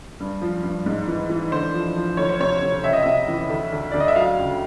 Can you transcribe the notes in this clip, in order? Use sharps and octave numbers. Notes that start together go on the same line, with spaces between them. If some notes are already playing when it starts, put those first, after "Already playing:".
G2
F3
G2
G#2
E3
E3
D3 C5
F3
F3
D2 C#5
C5
C3 C#5
C3
C#2 E5
D#5
C3 E5
E3
D2
D2
D2 D5
D#5
E5
F#3 F5
C#2